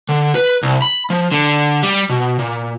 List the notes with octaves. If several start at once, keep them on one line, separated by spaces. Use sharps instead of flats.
D3
B4
C2
B5
F3
D3
G3
B2
A#2